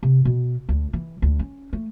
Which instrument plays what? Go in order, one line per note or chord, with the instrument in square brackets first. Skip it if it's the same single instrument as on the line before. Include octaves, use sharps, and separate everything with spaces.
[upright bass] C3
B2
D2
E3
D2
C#4
A3